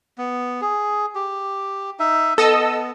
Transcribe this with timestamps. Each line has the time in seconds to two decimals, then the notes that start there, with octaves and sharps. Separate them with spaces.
0.18 B3
0.61 G#4
1.15 G4
1.99 D#4 E5
2.38 B3 A4 D#5 E6